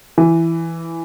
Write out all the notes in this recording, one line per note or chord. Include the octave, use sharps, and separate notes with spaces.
E3